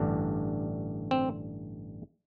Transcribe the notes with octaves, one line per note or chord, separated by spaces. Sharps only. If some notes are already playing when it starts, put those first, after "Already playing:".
Already playing: A1 G2 D3 D4
C4